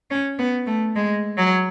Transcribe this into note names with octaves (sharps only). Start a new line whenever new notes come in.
C#4
B3
A3
G#3
F#3